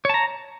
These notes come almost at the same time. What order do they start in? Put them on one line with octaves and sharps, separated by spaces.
C#5 A5 A#5